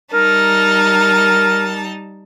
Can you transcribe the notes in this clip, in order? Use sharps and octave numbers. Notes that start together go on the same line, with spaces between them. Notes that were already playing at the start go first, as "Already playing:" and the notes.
G3 D#4 A#4 A5